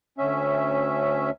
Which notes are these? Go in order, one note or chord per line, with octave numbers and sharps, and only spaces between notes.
D2 C#4 E5